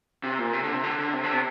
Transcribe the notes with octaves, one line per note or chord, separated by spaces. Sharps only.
C3
A#2
C3
D3
C3
D3
D3
C3
D3
C3